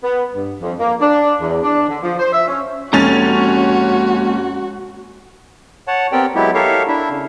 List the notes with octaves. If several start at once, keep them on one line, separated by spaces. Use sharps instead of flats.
B3
G2
F2
A#3
D4
E2
D4
D3
F3
C5
E5
C#4
F1 G#3 A#3 C#4 F#4 A#5 A6
C#5 F#5 A5
B3 C4 G4 A#4 D5 G5
F#3 G#3 B3 E4 G4
G4 A4 A#4 C#5 E5 F5
D4 E4 E5
C#3